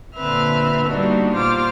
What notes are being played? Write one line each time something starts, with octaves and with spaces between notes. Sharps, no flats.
A#2 D3 C4 B4 E5 F6
G3 A#3 B3 D4 D#4 F#4
A#2 F4 C5 D6 F6